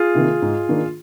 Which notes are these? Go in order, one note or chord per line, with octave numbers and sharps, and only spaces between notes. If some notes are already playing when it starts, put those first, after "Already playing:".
Already playing: F4 G#4
C3 D#3 A#3
G#2
D#3 A#3 D4